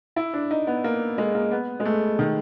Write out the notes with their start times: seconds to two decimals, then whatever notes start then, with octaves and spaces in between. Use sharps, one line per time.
0.16 E4
0.34 D4
0.51 D#4
0.67 B3
0.84 A#3
1.18 G#3
1.35 A#3
1.51 B3
1.80 G#3
1.85 A3
2.19 D#3